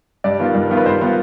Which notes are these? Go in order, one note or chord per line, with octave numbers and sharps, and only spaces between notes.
G2 D5
D#3 B3 F4
G2
D#3 B3 F4
B4
G2 C5
D#3 B3 F4